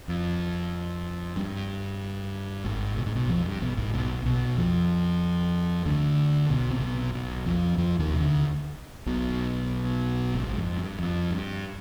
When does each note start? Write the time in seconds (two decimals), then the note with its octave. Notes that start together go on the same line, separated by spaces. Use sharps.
0.08 F2
1.36 G2
2.64 G#1 G#2
2.97 B2
3.06 G#2
3.15 B1 B2
3.29 F2 F3
3.45 G2
3.61 B1 B2
3.77 G#1 G#2
3.93 B1 B2
4.25 B1 B2
4.57 F2 F3
5.85 D2 D3
6.50 B1 B2
6.70 C3
6.81 B1 B2
7.14 B1 B2
7.46 F2 F3
7.78 F2 F3
7.99 D#2 D#3
8.14 C3
8.20 D2 D3
9.06 B1 B2
10.35 G#1 G#2
10.56 F2
10.77 G2
10.99 F2
11.31 G2